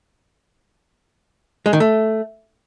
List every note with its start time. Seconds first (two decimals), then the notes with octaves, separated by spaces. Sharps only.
1.66 G#3
1.73 D#3
1.80 A3